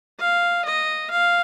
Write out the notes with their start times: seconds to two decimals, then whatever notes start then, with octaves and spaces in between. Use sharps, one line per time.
0.20 F5
0.65 D#5
1.11 F5